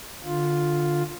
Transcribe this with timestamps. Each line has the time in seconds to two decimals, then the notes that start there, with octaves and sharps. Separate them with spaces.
0.24 D3 F4